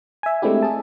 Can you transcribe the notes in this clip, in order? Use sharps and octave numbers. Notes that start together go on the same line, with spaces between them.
E5 G#5
G#3 A3 C4 D4 E4 G4
G#4 A5